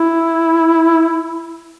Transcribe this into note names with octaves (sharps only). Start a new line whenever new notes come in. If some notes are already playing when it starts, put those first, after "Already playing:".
Already playing: E4